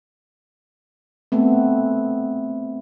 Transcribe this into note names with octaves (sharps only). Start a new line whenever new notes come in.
A3 B3 C4